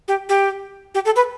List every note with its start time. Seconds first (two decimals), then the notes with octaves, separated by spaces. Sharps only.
0.08 G4
0.29 G4
0.95 G4
1.05 A4
1.16 B4